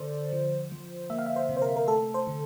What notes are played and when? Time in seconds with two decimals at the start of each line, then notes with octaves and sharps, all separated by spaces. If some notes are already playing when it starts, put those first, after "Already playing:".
Already playing: D3 A4 C5 D5
0.32 F3
0.72 F3
1.10 A#3 E5
1.18 F5
1.26 E5
1.36 C5
1.49 C3
1.57 C5
1.62 A#4
1.76 A#4
1.88 A3 A4
2.14 C5
2.27 D3